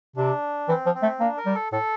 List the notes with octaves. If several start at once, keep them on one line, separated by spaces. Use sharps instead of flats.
C3 D4
E3 C4
F3
C4
A3
A#3 D4
A#4
G3
A4
A2 A4